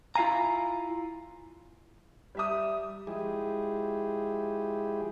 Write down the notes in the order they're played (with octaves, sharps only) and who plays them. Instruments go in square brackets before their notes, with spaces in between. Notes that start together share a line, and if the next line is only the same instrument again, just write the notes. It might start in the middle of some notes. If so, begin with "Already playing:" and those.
[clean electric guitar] E4 F4 F5 G#5 A#5
[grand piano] G3 E5 D#6
[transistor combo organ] F3 G#3 E4 G4 G#4